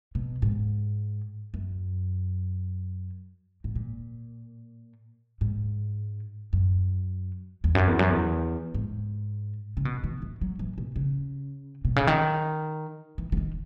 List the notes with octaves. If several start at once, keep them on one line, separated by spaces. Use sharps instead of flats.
B2
G#2
F#2
G#2
A#2
G#2
F#2
E2
F#2
E2
F#2
E2
G#2
C#3
B2
D#3
E3
F#3
E3
B2
C#3
B2
C#3
D#3
E3
E3
D#3